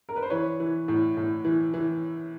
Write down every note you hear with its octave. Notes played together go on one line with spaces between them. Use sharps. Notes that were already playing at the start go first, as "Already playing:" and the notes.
A#4
B4
C5
E3 B4 C#5
E3
A2
A2
E3
E3